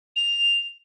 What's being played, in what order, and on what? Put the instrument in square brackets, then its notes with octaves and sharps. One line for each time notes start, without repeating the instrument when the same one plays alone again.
[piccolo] F7